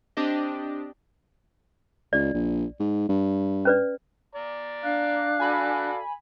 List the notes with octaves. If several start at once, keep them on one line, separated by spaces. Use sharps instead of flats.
C4 D4 G4 D#5
C#2 D5
A#1
G#2
G2
C#4 B4 D5
D5 A#5
D4 F5 F#6
F#4 A4 D5 G#5 B5